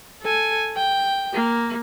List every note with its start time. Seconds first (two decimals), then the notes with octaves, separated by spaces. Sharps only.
0.22 A4 G#5
0.77 G5
1.33 A#3